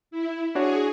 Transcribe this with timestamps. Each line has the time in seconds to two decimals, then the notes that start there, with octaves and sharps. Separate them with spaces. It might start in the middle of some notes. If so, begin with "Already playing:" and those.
0.11 E4
0.55 D4 F#4 G#4 C#5